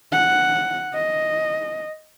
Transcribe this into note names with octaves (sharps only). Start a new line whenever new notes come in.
F#5
D#5